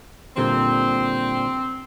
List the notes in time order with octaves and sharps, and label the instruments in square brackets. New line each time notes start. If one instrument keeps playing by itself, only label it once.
[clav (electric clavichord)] A#2 D3 G3 [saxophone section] C4